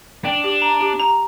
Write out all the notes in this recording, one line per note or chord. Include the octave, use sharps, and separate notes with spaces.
D4 G5
G4
A#5
G4
A#5